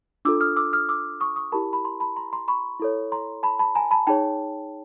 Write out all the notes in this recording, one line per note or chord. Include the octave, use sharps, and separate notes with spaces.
D4 F4 A4 D6 E6
D#6 F6
D6 E6
D#6 F6
D6 E6
C#6 D#6
C#6 D#6
E4 G4 A#4 A5 B5
B5
A#5 C6
A5 B5
A#5 C6
A#5 C6
B5 C#6
E4 A4 C#5
A#5 C6
A5 B5
A5 B5
G#5 A#5
A5 B5
D#4 G#4 C#5 G5 A5